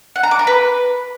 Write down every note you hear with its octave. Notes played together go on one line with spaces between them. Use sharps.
F#5
A#5
D6
A#4
B4